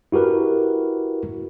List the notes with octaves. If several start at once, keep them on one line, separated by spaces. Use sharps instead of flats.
E4 F#4 G4 A#4 B4